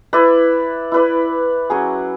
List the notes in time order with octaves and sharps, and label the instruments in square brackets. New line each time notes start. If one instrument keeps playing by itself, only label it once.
[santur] E4 B4 D5
E4 B4 D5
F#3 C#4 G#4